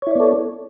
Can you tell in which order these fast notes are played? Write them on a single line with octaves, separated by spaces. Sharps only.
C#5 E4 D5 B3 A4